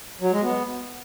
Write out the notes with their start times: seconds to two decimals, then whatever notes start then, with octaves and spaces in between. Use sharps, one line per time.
0.21 F#3
0.32 G#3
0.43 B3